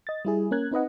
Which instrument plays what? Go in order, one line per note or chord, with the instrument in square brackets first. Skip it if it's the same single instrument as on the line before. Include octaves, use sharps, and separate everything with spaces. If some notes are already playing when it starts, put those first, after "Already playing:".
[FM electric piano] D#5 A6
G3 E4 G#4
A#3 C#4 A#4 F#6 G#6
C4 D#4 B4 D#5 F#5